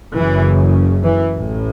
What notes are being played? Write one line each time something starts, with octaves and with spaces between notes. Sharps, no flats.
F#1 F#2 C#3 E3
E3
A1 A2